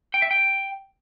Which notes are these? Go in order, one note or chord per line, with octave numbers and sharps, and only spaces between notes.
G5
E5
G5